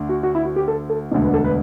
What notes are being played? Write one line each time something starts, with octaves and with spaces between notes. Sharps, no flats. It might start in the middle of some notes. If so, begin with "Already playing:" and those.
Already playing: D2 D3
F#4
F#4
E4
F#4
G4
A4
A4
E1 D2 D3
B4
A4
B4